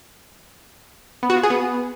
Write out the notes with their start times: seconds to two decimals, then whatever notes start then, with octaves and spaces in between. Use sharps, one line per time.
1.23 B3
1.30 F#4
1.36 F4
1.43 G#4
1.50 B3